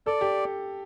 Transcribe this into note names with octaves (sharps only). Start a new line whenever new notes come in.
A4 D5
G4